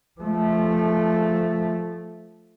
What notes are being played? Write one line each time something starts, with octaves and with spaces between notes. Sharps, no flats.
F3 A3